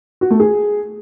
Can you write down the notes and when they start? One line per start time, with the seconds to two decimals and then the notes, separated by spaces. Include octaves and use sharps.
0.21 F#4
0.30 A3
0.40 G#4